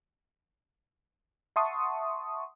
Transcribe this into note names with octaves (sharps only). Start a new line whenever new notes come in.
E5 F#5 A5 C6 C#6 D#6